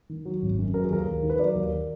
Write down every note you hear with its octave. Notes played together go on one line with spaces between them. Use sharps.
D#3
F#3
G#1
F#2
F#3 A#4
G#4
D#2 A#4
D#2
D#3
B4
F#3 A#4 D5
D#2